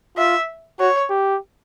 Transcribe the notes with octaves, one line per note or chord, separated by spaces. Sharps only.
F4 E5
F#4 C#5
G4